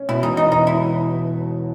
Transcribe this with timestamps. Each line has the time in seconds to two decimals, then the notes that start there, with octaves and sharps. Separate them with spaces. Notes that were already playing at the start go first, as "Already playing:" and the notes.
Already playing: C#4
0.09 B2 E4
0.23 E1 D#4
0.37 E1 D#4
0.52 E2 D#4
0.67 E4